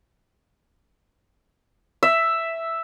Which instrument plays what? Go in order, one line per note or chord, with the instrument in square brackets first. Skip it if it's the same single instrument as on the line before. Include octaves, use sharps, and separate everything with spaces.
[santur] E5